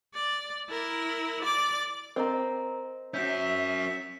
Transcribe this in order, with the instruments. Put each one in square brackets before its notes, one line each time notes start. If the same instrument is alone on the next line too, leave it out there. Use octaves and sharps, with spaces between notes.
[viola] D5
E4 A#4
D5 D6
[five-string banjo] C4 [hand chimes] A#4 D#5 A#5
[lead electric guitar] C#4 F#4 [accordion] E5 [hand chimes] G6